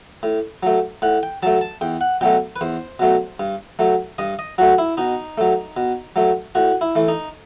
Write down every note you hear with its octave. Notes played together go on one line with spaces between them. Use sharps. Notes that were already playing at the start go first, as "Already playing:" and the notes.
A2
F#3 A3
A2 F#5
G5
F#3 A3 A5
A5
E2 G5
F#5
B2 F#3 A3 G5
B4
E2 C5
B2 F#3 A3
G2
F#3 A3
G2 D#5
D#5
F#3 A3 F#4
E4
B2 D#4
F#3 A3
B2
F#3 A3
A2 F#4
E4
E3 A3
D#4